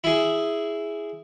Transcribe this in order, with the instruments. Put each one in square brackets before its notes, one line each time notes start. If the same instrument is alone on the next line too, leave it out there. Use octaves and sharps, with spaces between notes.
[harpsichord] E4 G#4